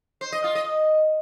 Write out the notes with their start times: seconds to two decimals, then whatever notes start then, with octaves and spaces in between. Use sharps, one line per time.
0.21 C5
0.32 D#5
0.44 F4
0.55 D#5